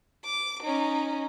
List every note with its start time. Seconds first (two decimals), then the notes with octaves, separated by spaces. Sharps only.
0.25 D6
0.63 C#4 D#4